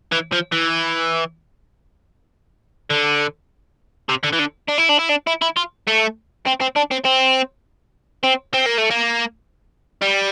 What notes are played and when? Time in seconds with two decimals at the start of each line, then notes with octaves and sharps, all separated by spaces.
0.12 E3
0.32 F3
0.52 E3
2.90 D3
4.09 C3
4.23 D3
4.33 E3
4.39 D3
4.68 D4
4.78 E4
4.89 D4
4.99 E4
5.09 D4
5.27 E4
5.42 E4
5.57 F4
5.87 A3
6.46 C4
6.60 C4
6.76 D4
6.91 C4
7.05 C4
8.24 C4
8.54 C4
8.66 A#3
8.78 A3
8.91 A#3
10.02 G3